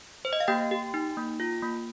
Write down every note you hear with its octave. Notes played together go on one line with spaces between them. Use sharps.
C5
D#5
F5
A#3 G4 G5
G4
D#4
A#3
F4
A#3